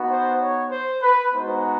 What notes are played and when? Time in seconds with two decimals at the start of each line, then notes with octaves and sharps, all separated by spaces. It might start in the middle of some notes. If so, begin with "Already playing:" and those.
Already playing: B3 D#4 F#4
0.08 C5
0.39 C#5
0.70 C5
1.02 B4
1.33 G#3 B3 D#4 F#4 C5